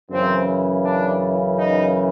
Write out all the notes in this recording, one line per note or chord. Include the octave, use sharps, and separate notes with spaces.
F#2 C#3 E3 C4
D4
D#4